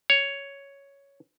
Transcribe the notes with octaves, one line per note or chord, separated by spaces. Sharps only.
C#5